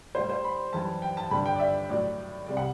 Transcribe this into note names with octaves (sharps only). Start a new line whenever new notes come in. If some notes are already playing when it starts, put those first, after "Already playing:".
A2 G3 C5
C5
B5
F#2 E3 G3 A5
G5
A5
G2 D3 G3 B5
G5
D5
E5
A2 F#3 D5
C2 C3 G3 D5
F#5